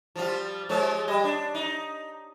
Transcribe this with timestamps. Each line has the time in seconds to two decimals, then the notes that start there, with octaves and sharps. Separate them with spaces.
0.16 F3 G3 F4
0.69 F3 G#3 C#5
1.08 G3 D#5
1.24 D4
1.55 D#4